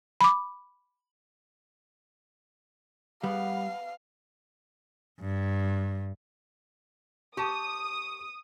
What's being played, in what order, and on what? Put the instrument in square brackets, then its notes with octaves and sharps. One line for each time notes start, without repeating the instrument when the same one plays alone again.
[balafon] B5 D6
[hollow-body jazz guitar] G3 [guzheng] B3 [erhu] F5
[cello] G2
[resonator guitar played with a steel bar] G4 A5 [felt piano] C#6 [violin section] D#6